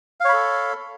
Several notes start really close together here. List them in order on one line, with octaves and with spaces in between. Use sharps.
F5 C#5 B5 A4